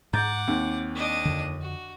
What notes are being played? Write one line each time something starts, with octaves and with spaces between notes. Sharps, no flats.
G#2 F#5 A#5 D6 G6 A6
D#2 C4
D4 D#5
F2 D3
F#4